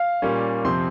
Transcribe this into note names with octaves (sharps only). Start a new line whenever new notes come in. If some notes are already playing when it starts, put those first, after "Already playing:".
Already playing: F5
A#2 G3 A#3 C#4
F2 C3 F3 C4 C6